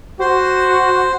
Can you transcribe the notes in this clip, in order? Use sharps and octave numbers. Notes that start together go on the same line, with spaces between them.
F#4 C5